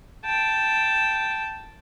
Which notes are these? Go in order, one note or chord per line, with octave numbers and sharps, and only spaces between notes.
G5 A5